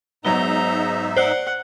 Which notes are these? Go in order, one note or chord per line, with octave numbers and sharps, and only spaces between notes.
G#2 F#3 B3 D#4 E5 A#5 G7
C5 D5 F#5 F#6